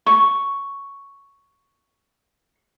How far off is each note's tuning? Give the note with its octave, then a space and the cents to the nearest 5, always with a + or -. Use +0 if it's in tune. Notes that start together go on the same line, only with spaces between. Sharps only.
C#6 +5